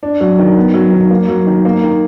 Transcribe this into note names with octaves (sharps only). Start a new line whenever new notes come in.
D4
F#3
D#3
B3
F#3
D#3
A#3
F#3
D#3
A#3
D#3